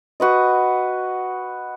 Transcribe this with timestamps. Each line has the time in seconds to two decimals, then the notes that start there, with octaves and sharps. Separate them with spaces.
0.20 F#4 B4 D#5